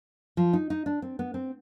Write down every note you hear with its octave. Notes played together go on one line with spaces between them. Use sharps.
F3
D#4
D#4
D4
C4
B3
C4